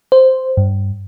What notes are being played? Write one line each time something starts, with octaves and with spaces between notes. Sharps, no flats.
C5
G2